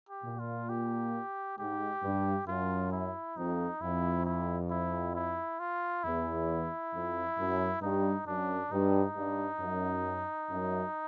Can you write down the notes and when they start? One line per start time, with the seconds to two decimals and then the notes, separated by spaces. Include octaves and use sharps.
0.09 G4
0.24 A#2
0.39 F4
0.69 G4
1.58 G#2 G4
2.03 G2
2.47 F#2 F4
2.92 E4
3.36 F2 D#4
3.81 F2 E4
4.25 E4
4.70 E4
5.15 E4
5.60 F4
6.04 E2 E4
6.93 F2
7.38 F#2
7.82 G2 D#4
8.27 F#2 D4
8.71 G2 D#4
9.16 G2
9.60 F#2
10.49 F#2